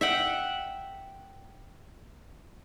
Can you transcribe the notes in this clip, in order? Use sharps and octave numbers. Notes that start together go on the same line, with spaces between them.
E5 F#5 G5